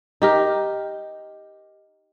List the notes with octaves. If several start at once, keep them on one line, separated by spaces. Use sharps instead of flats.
D#4 G4 A#4